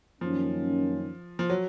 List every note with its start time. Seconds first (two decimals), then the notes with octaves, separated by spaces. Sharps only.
0.21 F#2 D#3 F3 A#3 C#4
1.39 F3
1.50 F#3